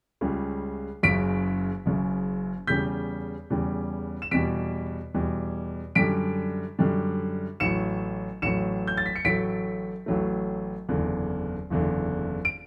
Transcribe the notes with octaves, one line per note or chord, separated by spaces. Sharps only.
C#2 C#3 G3
F#1 F#2 C#3 B6 D7
F#1 F#2 C#3
E2 C#3 G3 G6 B6
E2 C#3 G3
E7
E2 B2 G3 B6 D7
E2 B2 G3
F#2 D3 G3 B6 D7
F#2 D3 G3
A1 A2 F#3 C#7 E7
A1 A2 F#3 C#7 E7
G6
A6
B6
C#7
A1 A2 F#3 A3 B6 D7
A1 A2 F#3 A3
F#1 E2 D3
F#1 E2 D3
D7